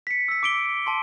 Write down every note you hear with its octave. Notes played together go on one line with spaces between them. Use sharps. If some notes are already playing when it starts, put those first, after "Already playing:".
B6 C#7
E6 B6
D6 D7 G7
A5 C6